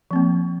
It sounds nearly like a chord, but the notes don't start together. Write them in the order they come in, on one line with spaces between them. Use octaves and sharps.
F3 C4 A#3